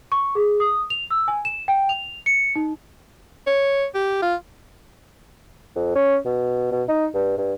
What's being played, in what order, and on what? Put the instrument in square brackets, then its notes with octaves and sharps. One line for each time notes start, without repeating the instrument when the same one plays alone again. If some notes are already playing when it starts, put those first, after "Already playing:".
[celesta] C#6
G#4
D#6
F7
E6
G#5
E7
G5
F7
C#7
D#4
[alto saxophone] C#5
G4
F4
[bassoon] F2
C#4
B2
B2
D#4
G2
G2